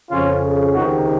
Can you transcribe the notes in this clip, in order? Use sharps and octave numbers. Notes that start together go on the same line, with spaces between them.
F2 C#3 C#4 F4
C#2 C3 D#3 D#4 F#4